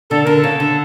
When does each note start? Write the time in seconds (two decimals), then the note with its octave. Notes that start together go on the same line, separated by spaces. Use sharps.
0.10 D3 A4
0.24 D3 A#4
0.36 A4
0.44 C#3
0.60 D3